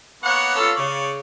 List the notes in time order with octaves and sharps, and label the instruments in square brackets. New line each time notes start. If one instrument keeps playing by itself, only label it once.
[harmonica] A#3 B3 [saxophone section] C#5 F#5
[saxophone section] C#4 F4 A4
[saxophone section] C#3 [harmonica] C#5 D5